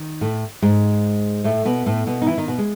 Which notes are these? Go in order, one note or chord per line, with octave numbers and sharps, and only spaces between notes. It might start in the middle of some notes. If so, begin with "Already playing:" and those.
Already playing: D#3
A2 A3
G#2 G#3
A2 A3
B2 B3
A2 A3
B2 B3
D#4
E3 E4
D#3 D#4
B2 B3
G#3